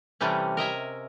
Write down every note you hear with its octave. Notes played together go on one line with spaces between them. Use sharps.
C3 E3 G3 A3 C#4
A#4 D#5 E5 G#5